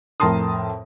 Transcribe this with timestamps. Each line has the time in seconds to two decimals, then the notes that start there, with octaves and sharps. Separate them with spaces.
0.20 F2 A2 A#4 A5 C6 D#6